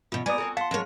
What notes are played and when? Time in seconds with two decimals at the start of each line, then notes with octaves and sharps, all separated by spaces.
0.12 E2 B2 F4
0.26 G3 B3 A#4 D5 G#5 D#6
0.38 C4 F#4 A4
0.57 F5 F#5 A5 C6
0.71 F2 F#3 G#3 A#4 C#5